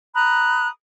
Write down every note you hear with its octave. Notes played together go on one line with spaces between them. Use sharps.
A#5 B5 D#6 F#6